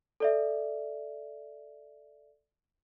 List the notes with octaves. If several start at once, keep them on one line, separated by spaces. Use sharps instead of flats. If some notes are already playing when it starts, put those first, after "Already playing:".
A4 D5 E5